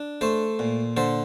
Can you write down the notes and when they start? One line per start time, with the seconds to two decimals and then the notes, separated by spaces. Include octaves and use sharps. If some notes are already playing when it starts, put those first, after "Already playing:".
Already playing: D4
0.21 A3 A4 C5
0.59 A#2
0.97 D3 A4 C5